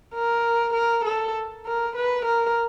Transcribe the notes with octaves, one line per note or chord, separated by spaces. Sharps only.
A#4
A#4
A4
A#4
B4
A#4